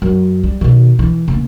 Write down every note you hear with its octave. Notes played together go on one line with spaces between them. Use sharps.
F#2
G3
B2 D#3
E3
C#3 A#3